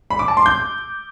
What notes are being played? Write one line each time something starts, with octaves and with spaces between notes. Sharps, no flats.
B5
D6
A5
C6
G6